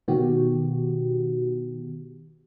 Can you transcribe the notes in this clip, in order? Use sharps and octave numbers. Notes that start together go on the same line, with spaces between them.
B2 D#3 B3 F#4 G4